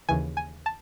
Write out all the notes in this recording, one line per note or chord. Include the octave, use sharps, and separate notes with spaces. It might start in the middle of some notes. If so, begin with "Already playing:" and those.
D#2 C#3 E3 G#5
G#5
A5